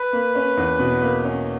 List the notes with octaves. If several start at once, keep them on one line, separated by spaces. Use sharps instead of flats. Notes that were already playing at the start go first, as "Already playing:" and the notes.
Already playing: B4
A#3
C#4
E2
B2
A#3
C#4